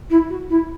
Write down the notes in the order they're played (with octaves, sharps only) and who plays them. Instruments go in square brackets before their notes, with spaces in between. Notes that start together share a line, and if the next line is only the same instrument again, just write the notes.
[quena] E4
F#4
E4